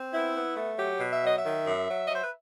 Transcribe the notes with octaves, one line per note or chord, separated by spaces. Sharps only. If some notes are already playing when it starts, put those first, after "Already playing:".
Already playing: C4
B3 E4
B3
A3
F#3 G4
B2
E5
F#3 D#5
D#3 E5
F#2
F#3
F#3 D#5
C5
B4